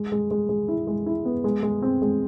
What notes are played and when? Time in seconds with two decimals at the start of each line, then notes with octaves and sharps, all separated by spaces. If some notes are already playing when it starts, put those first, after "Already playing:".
Already playing: G#3
0.12 G#3
0.31 G#3
0.49 G#3
0.68 E4
0.87 G#3
1.06 E4
1.25 B3
1.44 G#3
1.63 G#3
1.82 C4
2.02 G#3